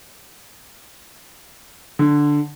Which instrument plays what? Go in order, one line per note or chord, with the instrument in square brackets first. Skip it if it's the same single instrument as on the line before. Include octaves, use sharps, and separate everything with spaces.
[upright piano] D3